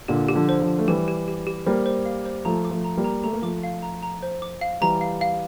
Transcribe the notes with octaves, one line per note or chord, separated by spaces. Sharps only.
A#2 D3 G4
G4
D3 F3
C5
D3 F3
G4
A3
E3 G3 G4
G4
G4
G4
G3 A#3 C5
C5
F5
C5
F3 A3 A#5
D6
F3 A3
A#5
G3 A#3
A#5
A3 A#5
A#3
F3 A3 D6
F5
A#5
A#5
C5
D6
F5
E3 G3 A#5
F5
F5